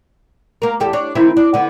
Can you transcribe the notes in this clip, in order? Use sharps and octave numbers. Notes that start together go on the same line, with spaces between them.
A#3 A#4
E2 G4 A4
D4 C#5
D#3 C4 E4
D4
D3 B3